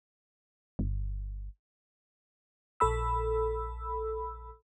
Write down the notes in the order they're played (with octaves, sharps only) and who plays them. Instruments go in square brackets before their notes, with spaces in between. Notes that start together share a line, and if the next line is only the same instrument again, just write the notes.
[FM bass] G1
[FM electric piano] A#1 A4 B5 E6